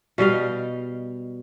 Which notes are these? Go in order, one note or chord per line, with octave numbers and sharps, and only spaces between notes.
B2 G3 D#5 F5